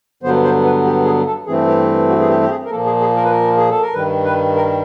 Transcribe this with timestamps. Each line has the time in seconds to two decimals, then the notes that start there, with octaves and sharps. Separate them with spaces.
0.23 G2 D3 F#3 B3 C5
0.43 C5
0.64 B4
0.85 G4
1.05 G#4
1.26 A4
1.46 G2 E3 A3 C4 G#4
1.67 G4
2.08 F#4
2.20 G#4
2.29 G4
2.42 G4
2.50 G#4
2.66 A#4
2.70 A#2 F3 A#3 A4
2.86 G#4
3.01 G#4
3.16 A#4
3.24 B4
3.30 A#4
3.57 G#4
3.69 A4
3.82 A#4
3.94 G2 D#3 G3 B4
4.24 B4
4.55 A#4